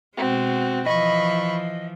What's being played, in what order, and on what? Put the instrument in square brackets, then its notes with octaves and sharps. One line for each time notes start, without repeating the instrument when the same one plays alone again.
[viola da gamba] B2 G#3 [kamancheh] C4 F#4
[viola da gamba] E3 F3 [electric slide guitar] D#5 [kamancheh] B5 C#6